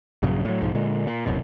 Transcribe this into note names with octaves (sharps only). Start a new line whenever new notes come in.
A#1 G2 C#3 F#3
A2 F#3
B1 G#2 F3
A#2 D3 G#3
A#2
E1 C2 F#2 B2